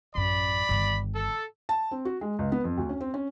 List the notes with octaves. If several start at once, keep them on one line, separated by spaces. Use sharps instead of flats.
A1 F#2 D5 B5
G1 D#3
A4
A5
C4
F#4
G#3
C#2
B3
F2
D2
C#4
C4
C#4